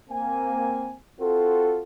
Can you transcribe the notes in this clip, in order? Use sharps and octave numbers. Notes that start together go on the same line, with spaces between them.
A#3 C4 G#5
C4 F4 F#4 A4